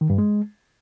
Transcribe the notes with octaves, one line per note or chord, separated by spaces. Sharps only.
D#3
G2
G#3